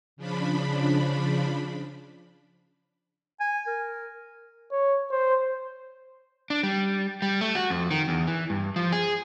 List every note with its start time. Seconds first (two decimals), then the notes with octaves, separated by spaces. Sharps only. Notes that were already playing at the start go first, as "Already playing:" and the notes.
0.17 C#3 F3 D4 B5
3.40 G#5
3.67 A#4
4.71 C#5
5.11 C5
6.50 D4
6.63 G3
7.22 G3
7.41 A3
7.55 F#4
7.70 F2
7.91 D#3
8.08 E2
8.27 E3
8.50 G2
8.76 F3
8.92 G#4